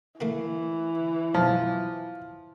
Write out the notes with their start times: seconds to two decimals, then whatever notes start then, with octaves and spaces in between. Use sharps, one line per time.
0.20 E3 A3 A#3 F#4
1.34 B1 F3